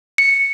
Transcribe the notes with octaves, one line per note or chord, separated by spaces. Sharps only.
C#7